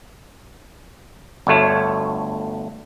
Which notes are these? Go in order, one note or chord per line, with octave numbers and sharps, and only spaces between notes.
G1 D2 A3 C#5